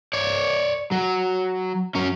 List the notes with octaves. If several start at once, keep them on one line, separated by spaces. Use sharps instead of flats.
C#5 D5
F#3
F#3 C#4